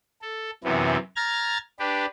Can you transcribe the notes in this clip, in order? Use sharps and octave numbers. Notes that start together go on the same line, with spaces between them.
A4
F#2 C3 E3 B3
A#5 F6 G#6 A6
D4 G4 B4